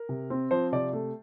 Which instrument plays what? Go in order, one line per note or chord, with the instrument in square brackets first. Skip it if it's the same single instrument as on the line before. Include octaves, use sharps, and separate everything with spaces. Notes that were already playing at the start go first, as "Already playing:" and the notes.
Already playing: [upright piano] A#4
C3
C4
F3 C5
C3 D5
A3